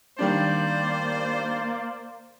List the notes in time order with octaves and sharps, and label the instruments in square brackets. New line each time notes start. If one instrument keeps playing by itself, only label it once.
[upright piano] D#3 G3 D4 [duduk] A#3 [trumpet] C5 [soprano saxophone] D5